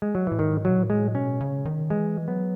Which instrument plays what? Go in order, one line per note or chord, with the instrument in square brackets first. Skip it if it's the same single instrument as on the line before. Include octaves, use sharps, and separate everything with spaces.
[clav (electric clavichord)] G#3
F#3
[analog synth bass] A2 [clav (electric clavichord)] E3
[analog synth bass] G#2 [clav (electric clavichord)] D#3
[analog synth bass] B2 [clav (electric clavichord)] F#3
[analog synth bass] A2
[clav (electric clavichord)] G#3
[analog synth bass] B2 [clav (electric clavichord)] C#4
[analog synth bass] C#3
D#3
[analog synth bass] E3 [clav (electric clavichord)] G#3
[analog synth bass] F#3 [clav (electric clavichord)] B3